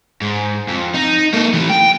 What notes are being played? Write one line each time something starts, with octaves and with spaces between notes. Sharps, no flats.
G#2
F2
D#4
A#3 A4
E3 A3
G5